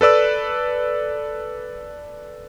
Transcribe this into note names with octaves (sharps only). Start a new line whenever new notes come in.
A4 B4 D5 E6